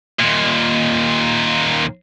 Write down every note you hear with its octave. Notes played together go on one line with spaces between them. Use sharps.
D#2 A#2